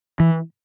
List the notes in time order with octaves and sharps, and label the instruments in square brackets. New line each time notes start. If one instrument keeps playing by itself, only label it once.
[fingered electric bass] E3